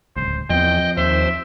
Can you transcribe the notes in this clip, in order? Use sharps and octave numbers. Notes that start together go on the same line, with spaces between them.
D1 G#1 C#2 C5
E2 F3 C4 D#5 G5
D#2 C5 E5